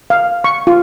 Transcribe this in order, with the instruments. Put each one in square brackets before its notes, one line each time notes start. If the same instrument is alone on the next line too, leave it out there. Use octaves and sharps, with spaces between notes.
[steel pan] F5
C#6
F4